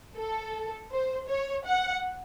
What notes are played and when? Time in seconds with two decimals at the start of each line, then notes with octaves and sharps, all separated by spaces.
0.17 A4
0.91 C5
1.28 C#5
1.65 F#5